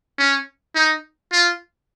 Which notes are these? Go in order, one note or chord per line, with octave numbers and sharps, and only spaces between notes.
C#4
D#4
F4